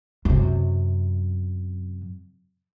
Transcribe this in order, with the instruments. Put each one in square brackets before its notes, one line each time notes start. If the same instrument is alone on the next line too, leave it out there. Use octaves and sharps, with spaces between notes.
[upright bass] F#2 C3